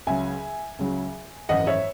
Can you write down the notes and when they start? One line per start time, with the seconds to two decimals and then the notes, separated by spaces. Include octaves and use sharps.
0.07 C#2 C#3 F#3 E5 G#5
0.79 C#2 C#3 F#3
1.49 G#1 F#2 E3 D#5 F#5
1.67 C#5 E5